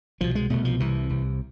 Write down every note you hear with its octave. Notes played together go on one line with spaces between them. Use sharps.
C2 B2 F3
G#3
C2 B2 A3
F3
C2 C3 E3
C2 C3